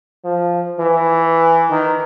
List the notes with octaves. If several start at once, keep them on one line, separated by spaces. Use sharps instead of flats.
F3
E3
D#3